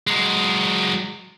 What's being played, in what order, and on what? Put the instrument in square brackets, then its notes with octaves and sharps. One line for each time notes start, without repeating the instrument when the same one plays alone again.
[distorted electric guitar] F#3 G#3